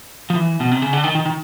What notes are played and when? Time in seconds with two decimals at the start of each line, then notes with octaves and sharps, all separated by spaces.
0.30 F3
0.35 E3
0.60 B2
0.71 C3
0.82 C#3
0.93 D3
1.04 D#3
1.15 D#3
1.26 D#3